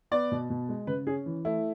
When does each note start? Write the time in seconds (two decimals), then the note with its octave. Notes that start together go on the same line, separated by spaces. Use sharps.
0.11 B3 D5
0.32 B2
0.50 B2
0.69 G#3
0.87 C#3 B4
1.07 C#4 G#4
1.26 E3
1.45 A3 E4